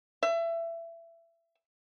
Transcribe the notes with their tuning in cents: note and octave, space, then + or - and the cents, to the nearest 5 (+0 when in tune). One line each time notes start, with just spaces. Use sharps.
E5 +25